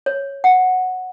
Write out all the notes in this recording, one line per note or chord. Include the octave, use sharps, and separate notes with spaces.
C#5
F#5